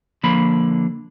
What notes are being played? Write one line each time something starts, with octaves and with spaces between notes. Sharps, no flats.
D3 F3 A#3 B5